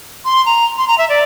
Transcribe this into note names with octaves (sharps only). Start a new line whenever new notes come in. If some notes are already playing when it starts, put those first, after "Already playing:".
C6
A#5
C6
A#5
E5
D5